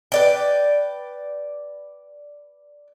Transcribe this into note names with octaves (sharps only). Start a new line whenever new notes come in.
B4 D5 G5